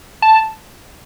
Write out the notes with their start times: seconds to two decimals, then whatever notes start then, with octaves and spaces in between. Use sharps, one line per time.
0.22 A5